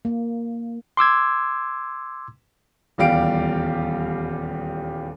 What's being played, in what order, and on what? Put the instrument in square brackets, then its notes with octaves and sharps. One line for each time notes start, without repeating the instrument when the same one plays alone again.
[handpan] A#3
[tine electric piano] C6 D6 E6 G#6
[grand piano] D#1 E2 G3 G4 F5 D7